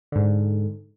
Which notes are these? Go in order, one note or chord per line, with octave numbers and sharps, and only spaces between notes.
G#2 D3